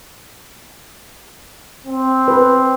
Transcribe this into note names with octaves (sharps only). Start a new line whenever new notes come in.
C4
B4